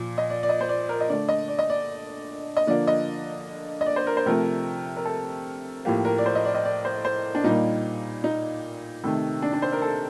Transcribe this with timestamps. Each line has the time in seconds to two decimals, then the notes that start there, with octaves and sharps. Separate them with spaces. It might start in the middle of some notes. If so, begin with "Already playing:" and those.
Already playing: A#2 F3
0.18 D#5
0.30 D5
0.43 D5
0.49 D#5
0.61 C5
0.69 D5
0.89 A#4
1.01 D#5
1.09 D3 A3 D5
1.29 D#5
1.48 D5
1.59 D#5
1.70 D5
2.57 D#5
2.67 D3 F3 A#3 D5
2.87 D#5
3.81 D#5
3.86 D5
3.96 C5
4.07 A#4
4.17 C5
4.26 C3 F3 A3 A#4
4.96 A#4
5.06 A4
5.85 A2 F3 A#3 G4
6.05 A#4
6.18 D5
6.26 C5
6.35 D#5
6.45 D5
6.54 D#5
6.65 D5
6.85 C5
7.05 C5
7.35 D4
7.44 A#2 G3 A#3 D#4
8.24 D#4
9.04 C3 D#3 A3
9.42 D4
9.53 D4
9.62 C5
9.72 A#4
9.82 A4